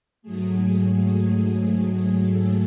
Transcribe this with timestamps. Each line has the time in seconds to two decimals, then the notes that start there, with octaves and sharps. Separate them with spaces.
0.22 G#2 F#3 A3 G#4
2.28 A4